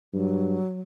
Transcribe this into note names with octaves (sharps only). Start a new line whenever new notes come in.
G2 F#3